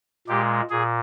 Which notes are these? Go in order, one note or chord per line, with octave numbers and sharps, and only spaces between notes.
A#2 G#3 G4
A#2 G#4